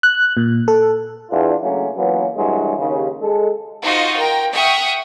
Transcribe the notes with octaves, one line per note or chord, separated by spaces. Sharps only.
F#6
A#2
A4
E2 D4 F4
C#3 F#3 A3 A#3 C#4
E3 F#3 A#3 B3 C#4 F4
C2 G2 E3 F#3 G#3
D#2 C#3
G#3 A4
D#4 F4 F#4 C5 D#5
A#4 G5
E5 F#5 G5 C#6 D#6 F6